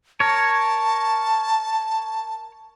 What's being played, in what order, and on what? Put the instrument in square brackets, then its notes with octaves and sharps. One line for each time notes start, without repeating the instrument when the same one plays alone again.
[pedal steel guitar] A#4 C#5 [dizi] A5